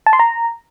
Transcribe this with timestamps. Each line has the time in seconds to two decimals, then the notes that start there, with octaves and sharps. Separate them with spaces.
0.06 A5
0.13 C6
0.19 A#5